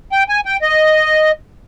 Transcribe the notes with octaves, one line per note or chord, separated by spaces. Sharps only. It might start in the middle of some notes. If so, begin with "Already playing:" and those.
G5
G#5
G5
D#5